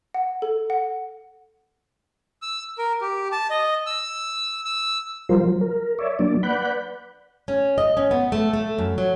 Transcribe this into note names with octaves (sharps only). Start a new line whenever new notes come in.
F#5
A4
F#5
E6
A#4
G4
A5
D#5
E6
E6
F3 G3 F4 A#4 C5
F#3
A#4
C#5 D5 E5
F#3 A#3 D4 D5
B4 D5 F#5 B5 F#6 G6
C#4
D#5
C#4
B3
A3
A3
F#2
F#3